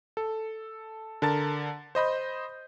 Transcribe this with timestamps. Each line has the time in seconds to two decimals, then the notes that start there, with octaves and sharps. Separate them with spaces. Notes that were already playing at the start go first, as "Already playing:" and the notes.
0.17 A4
1.22 D3 A#4 A5 A6
1.95 C5 D#5 B5 G6